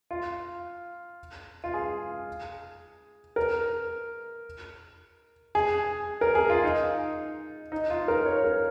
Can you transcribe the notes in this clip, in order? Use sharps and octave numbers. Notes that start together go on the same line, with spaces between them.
F4
F4
G#4
A#4
G#4
A#4
G#4
F4
D#4
D#4
F4
A#4
C#5
A#4